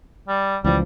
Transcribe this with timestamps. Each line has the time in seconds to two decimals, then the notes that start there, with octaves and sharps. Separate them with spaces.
0.28 G3
0.64 C#2 E3 F3 G3